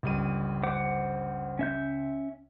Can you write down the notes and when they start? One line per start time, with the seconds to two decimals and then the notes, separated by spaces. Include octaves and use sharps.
0.03 G1 C#2 G3 D#7
0.63 C5 F#5 D6
1.59 C#4 E5 G6